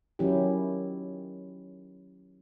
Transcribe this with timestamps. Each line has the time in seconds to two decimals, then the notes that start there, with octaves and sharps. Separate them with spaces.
0.19 D#3 F#3 C#4 E4 G4